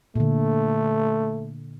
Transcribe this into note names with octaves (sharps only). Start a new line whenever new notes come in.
A#2 D3 A3